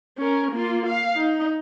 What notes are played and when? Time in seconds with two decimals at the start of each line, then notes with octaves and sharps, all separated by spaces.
0.18 C#4 A#4
0.52 A#3 F4
0.86 F5
1.16 D#4